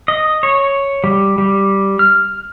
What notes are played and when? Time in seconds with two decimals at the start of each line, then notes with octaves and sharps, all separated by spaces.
0.08 D#5
0.43 C#5
1.04 G3
1.38 G3
1.99 F6